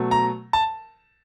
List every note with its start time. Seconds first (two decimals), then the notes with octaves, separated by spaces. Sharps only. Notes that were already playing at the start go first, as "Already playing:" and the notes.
Already playing: B2 F#3 A3
0.11 A#5
0.53 A5